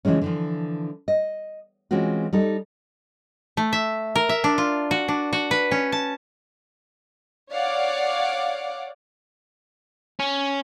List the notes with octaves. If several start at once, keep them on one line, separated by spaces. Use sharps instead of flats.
C#3 E3 F3 G#3 C#4
D3 E3 F3
D#5
E3 G#3 C4 C#4 F4 F#4
G3 D#4 A4
A3
E5
A#4
E5
D4
F4
F#4
D4
F#4
B4
C#4
A5
C#5 D5 F5 F#5 D6
C#4